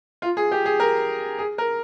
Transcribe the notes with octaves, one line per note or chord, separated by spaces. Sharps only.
F4
G#4
G4
G#4
A#4
G#4
A#4